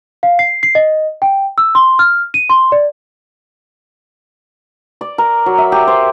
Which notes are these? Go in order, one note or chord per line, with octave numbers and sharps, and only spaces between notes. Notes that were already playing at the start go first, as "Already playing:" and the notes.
F5
C7
C7
D#5
G5
E6
C6
F6
D#7
C6
D5
D5
A#4
F#3
E5
G4
C5